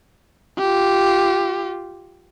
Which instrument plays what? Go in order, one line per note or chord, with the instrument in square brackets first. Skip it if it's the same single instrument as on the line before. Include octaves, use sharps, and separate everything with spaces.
[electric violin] F4 G4